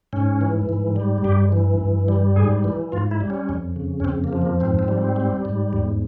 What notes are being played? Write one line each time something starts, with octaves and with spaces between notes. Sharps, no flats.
G#2 C#4
E3
G#2
G3
G2 G4
E3
G2
G3
G#2 G#4
E3
G#2 F4
E4
G3
C#4
F2
C#3
C#4
F2 C4
A#3
F3
A#3
G#2 C4
C4
G3
C4
G3
G#2
E2